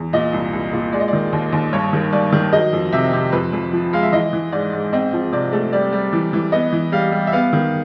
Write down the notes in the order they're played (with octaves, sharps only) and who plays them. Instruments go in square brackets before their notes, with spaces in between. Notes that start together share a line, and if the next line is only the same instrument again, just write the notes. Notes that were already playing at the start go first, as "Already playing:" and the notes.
Already playing: [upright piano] E2
A#2 D#5
C2
C2
A#2
G#3 D5
D#5
D5
D#3
D#2
D#2
G2 C#5
D#3
G2 D5
D#3
F#3 D#5
F2
C3 E5
C3
F2 B4
F2
F3
G#3 F5
E5
E3 D#5
E3
G#2 D5
G#2
C4 D#5
F3
C3 D5
A3
G3 D5
G3
E3
E3
B3 D#5
E3
G3 F5
G3
E5
B3 F5
D#3